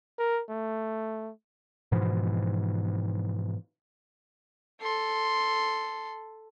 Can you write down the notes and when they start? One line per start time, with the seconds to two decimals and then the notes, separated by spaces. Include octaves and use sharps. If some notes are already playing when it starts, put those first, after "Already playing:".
0.19 A#4
0.50 A3
1.92 G#2 B2 E3 F3
4.81 A4 C6